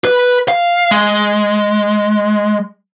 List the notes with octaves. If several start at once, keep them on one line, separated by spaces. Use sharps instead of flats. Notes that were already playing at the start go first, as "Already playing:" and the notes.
B4
F5
G#3